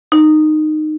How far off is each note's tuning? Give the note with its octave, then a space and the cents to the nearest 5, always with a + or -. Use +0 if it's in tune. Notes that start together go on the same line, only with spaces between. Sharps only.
D#4 -15